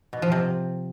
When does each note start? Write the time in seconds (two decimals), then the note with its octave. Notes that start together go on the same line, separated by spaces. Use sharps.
0.13 B2
0.22 F3
0.32 C3